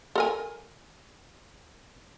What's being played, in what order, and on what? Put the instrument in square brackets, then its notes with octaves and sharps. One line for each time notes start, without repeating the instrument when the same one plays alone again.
[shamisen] A4 A#4 G#5